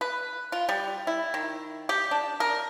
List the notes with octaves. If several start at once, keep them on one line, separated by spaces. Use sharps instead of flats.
B4
F4
G3
E4
D#3
G4
D4
A#4